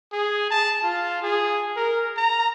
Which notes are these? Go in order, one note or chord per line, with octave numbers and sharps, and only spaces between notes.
G#4
A5
F4
G#4
A#4
A#5